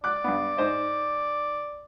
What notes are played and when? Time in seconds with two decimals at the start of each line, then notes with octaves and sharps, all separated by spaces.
0.04 D5 D6 F#6
0.24 G2 B3
0.57 G#2 C5 D#5